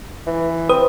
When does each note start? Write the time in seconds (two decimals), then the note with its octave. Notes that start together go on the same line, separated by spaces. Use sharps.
0.26 E3
0.69 C4 B4 D#6